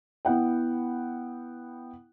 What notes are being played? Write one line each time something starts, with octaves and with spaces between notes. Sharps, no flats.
B3 E4 F#5 G5